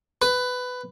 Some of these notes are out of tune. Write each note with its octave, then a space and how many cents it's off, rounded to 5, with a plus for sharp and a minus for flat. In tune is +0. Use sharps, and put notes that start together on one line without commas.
B4 +15